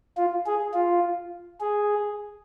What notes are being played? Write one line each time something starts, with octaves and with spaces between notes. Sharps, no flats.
F4
G#4
F4
G#4